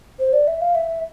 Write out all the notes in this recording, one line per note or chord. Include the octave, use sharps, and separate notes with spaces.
C5
D5
E5
F5
E5